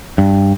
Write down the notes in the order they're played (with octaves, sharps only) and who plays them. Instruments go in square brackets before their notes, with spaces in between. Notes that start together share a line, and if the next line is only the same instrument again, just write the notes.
[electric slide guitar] G2